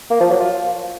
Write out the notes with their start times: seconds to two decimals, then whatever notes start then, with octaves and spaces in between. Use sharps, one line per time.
0.10 A#3
0.20 F3
0.30 F#3
0.40 F4